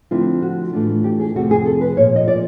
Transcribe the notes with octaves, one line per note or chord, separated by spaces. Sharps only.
D3 F3 A3 C4 E4 F4
F#4
A2 E3 A3 D4 F4
G4
G#4
F2 C3 F3 A3 C4 F#4
G#4
A4
B4
A#2 F3 A#3 C#5
D#5
D5